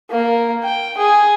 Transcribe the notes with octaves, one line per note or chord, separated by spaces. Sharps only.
A#3
G5
G#4